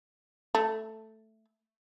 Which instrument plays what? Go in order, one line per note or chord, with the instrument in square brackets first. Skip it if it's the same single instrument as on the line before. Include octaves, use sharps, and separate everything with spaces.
[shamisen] A3